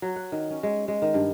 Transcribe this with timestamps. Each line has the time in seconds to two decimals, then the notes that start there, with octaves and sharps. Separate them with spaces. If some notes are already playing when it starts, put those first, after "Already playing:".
0.02 F#3
0.16 F#5
0.32 D#3
0.50 C#4
0.63 G#3
0.88 G#3
1.02 D#3
1.14 G2